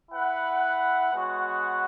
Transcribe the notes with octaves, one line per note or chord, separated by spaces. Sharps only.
E4 B4 F#5
G#3 B3 F#4 C#5 F#5